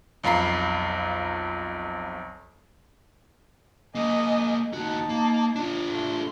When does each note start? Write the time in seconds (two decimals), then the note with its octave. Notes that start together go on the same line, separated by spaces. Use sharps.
0.23 B1 F2 F5 A#5 B5 C7
3.95 A#3 A4 D#5 G#5
4.73 D#2 D#4 F#4 A5
5.09 A#3
5.56 D4 F4
5.88 A3 C6